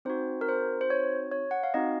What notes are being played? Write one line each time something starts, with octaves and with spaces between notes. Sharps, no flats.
C4 D#4 F#4 C5
A#4
C5
C5
C#5
C#5
F#5
F5
C4 D#4 F#4 D#5